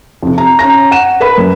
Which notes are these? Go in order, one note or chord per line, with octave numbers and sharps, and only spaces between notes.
F2 C3
A#5
C#4 A#5 A#6
F#5 E7
A#4 B4 B5
F#2